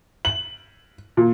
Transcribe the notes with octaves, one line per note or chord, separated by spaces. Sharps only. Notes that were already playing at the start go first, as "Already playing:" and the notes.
F#7
A#2